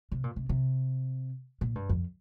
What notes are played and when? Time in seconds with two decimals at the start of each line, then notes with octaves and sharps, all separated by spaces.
0.12 C3
0.24 A#2
0.36 C3
0.49 C3
1.61 A#2
1.75 G2
1.89 F2